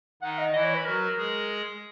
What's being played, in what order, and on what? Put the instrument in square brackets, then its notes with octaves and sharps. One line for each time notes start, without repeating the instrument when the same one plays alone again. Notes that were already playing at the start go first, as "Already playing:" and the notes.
[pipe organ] D#3 D#4 [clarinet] F#5
[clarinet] D#5
[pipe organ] E3 E4 [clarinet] D#5
[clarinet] C#5
B4
[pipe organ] F#3 F#4 [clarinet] A#4
[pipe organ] G#3 G#4